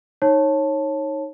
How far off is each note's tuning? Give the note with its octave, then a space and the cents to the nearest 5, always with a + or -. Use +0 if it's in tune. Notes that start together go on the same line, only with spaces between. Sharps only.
D#4 +0 C#5 -20 A5 +0